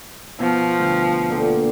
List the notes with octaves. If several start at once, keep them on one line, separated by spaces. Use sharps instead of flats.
B2 F3 F4
D2 G5
A#2 D3 G5